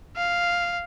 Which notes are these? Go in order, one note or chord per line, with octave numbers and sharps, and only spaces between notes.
F5